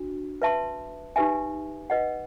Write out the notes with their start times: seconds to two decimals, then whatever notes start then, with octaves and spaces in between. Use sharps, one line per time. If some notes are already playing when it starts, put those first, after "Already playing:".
Already playing: D4 F#4
0.42 B4 E5 A5 C6
1.16 D#4 G4 B4 E5 G#5
1.90 B4 D#5 F#5